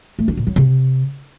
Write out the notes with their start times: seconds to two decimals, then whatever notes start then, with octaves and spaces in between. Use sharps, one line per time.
0.19 A3
0.28 D4
0.37 A#2
0.47 F#3
0.56 C3